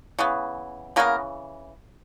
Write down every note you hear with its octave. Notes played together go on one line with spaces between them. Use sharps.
C#3 E3 B3
C#3 E3 A#3 B3 A#4